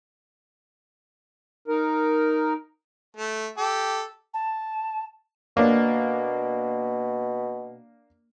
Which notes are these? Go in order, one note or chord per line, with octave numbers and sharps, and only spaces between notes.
D#4 A#4
A3
G4 A4
A5
B2 A#3 D4